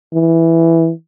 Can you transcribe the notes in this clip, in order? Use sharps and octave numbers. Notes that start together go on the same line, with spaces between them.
E3